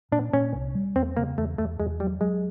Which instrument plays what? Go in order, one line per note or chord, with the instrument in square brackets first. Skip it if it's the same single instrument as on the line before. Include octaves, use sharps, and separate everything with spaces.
[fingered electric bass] A#2 [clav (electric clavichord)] D4
[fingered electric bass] A#2 [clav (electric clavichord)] C#4
[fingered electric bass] C2
G3
[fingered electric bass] E2 [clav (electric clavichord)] C4
[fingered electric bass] C#3 [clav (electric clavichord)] A#3
[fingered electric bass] E2 [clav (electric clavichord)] A3
[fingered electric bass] E2 [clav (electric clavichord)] A3
[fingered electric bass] E2 [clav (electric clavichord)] G#3
[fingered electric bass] F#3 [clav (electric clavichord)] G3
[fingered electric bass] F#3 [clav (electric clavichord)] G#3